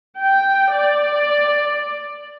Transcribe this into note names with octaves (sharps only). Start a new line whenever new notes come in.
G5
D5